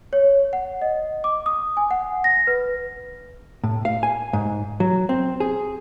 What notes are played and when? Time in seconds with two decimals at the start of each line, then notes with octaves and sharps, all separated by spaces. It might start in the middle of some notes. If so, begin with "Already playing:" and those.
0.13 C#5
0.53 F#5
0.82 D#5
1.24 D6
1.46 D#6
1.77 G#5
1.91 F#5
2.24 A#6
2.47 B4
3.64 A2
3.85 F5
4.03 G#5
4.33 G#2
4.80 F#3
5.09 C4
5.40 G#4